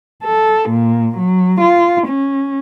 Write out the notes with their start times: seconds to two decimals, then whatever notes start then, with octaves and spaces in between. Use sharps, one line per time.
0.23 A4
0.70 A#2
1.18 F#3
1.61 F4
2.08 C#4